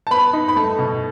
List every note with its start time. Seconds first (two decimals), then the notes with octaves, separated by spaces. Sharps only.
0.07 A5
0.11 B3 B5
0.33 D#4
0.48 B5
0.56 A3 A5
0.78 B2